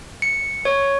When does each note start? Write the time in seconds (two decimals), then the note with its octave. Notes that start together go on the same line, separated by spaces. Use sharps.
0.22 C#7
0.65 C#5